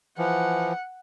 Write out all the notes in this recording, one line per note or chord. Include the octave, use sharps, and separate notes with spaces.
E3 F3 F#5